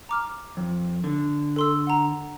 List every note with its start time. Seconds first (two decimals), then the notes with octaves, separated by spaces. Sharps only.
0.09 A#5 D6 F6
0.57 F2
1.04 D3
1.56 A4 C6 E6
1.87 F#5 A#5